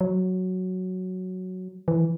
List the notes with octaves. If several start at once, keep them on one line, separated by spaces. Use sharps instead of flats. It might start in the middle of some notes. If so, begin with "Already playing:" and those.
F#3
E3